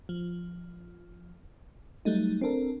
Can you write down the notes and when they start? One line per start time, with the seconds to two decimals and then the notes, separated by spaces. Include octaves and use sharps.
0.09 F3
2.05 F#3 G3 A3 D#4
2.41 C4 D4 A4 A#4